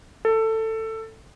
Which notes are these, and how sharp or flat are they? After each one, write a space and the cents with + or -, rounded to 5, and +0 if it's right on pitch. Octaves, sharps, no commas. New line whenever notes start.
A4 +15